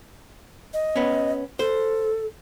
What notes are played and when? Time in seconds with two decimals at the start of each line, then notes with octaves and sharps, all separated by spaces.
0.74 D#5
0.96 B3 C#4
1.59 A4 C5